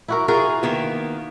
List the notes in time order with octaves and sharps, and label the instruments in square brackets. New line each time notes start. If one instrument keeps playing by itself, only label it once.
[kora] E4 F#4 A#4
[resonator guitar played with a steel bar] F4 G#4 [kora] F#4 A#4
[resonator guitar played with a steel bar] D#3 A#3 B3